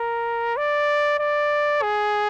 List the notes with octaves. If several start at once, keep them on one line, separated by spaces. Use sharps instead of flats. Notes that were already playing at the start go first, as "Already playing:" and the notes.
Already playing: A#4
D5
D5
G#4